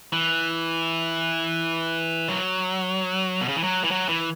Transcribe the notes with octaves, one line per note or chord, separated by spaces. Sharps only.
E3
F#3
B2
C#3
E3
F#3
E3
F#3
E3